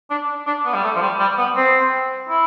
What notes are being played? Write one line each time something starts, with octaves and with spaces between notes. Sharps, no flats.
D4
D4
B3
G3
A3
F3
G3
G3
B3
C4
E4